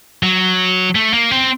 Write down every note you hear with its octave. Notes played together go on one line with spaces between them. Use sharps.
F#3
A3
A#3
C4